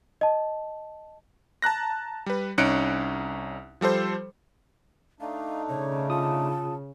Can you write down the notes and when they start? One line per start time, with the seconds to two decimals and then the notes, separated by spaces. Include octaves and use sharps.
0.21 D#5 A5
1.62 A5 A#5 F#6 A#6
2.26 G3 B4
2.58 C2 C#4 D#4 F#6 C#7 D7
3.81 F3 G3 A4 C5
5.21 A3 D4 D#4 F5
5.69 C#3 C#5
6.10 F4 A5 D#6